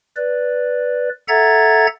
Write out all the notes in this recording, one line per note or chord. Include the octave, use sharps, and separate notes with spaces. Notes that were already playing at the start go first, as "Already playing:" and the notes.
B4 D5
A4 E5 F#5 A#5 G#6 A6